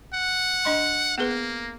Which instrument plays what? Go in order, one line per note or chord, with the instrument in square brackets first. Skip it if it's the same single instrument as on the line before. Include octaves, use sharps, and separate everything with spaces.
[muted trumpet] F#5
[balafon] D4 D#5 C6
[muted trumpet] A#3 [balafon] B3 G#4 B4